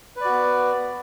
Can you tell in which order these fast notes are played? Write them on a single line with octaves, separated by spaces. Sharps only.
B4 D5 F#4 B3